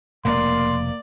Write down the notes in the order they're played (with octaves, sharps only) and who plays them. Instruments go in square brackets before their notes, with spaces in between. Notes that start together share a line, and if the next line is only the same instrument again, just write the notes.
[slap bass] F1 F2 B2 [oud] A#3 [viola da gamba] D5 [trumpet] C6